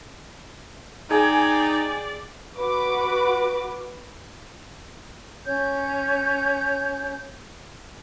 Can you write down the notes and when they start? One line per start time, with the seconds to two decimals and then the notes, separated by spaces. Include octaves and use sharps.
1.10 D#4 G#4 D5 G5 G#5
2.57 F#4 B4 D6
5.45 C#4 C#5 G6